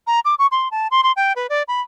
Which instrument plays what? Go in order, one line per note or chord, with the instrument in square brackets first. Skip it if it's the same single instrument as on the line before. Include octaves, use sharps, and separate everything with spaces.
[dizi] A#5
D6
C#6
C6
A5
C6
C6
G5
B4
D5
B5